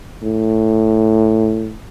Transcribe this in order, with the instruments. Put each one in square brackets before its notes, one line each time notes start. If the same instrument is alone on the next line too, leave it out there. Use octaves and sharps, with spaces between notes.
[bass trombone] A2